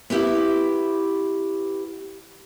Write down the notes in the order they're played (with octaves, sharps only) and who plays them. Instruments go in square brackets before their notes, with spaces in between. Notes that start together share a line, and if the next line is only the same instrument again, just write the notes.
[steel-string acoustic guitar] B3 E4 G4 B4 E5